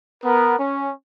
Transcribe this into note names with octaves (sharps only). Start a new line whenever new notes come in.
B3 A#4
C#4